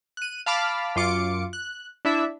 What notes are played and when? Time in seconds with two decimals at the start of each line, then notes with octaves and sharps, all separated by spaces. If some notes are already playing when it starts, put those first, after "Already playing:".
0.17 F#6 D#7
0.46 F5 A5 B5 D6 F6
0.96 F#2 F4 D6 C#7
1.53 F#6
2.05 D4 E4 E5